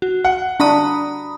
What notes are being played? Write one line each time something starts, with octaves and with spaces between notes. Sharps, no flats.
F#4
F#5
D4 A#5 B5 D#6